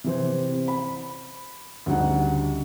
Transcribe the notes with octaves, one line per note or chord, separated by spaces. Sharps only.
C3 E3 C5
B5
D2 C#3 G3 D#4 F#5